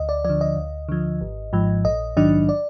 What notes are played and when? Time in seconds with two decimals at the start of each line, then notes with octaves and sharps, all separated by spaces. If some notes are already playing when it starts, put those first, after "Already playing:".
Already playing: D2 D#5
0.09 D5
0.24 D3 F3 D5
0.41 D#5
0.56 D2
0.89 D3 F3
1.21 G#1
1.53 G#2 F3
1.85 A#1 D#5
2.17 G#2 D#3 F#3 D4 D#5
2.49 D5